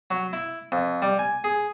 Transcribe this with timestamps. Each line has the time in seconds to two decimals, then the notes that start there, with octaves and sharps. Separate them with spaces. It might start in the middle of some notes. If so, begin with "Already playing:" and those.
0.11 F#3
0.33 E4
0.72 F2
1.02 G3
1.19 G#5
1.44 G#4